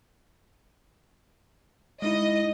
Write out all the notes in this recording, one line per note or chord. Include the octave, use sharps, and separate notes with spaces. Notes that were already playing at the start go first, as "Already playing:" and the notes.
G#3 D#4 E4 D#5